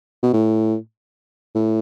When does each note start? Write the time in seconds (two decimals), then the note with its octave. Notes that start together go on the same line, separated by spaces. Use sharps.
0.23 B2
0.33 A2
1.55 A2